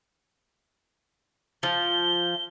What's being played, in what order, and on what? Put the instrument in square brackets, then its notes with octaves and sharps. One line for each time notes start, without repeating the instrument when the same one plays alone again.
[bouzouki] F3 [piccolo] G7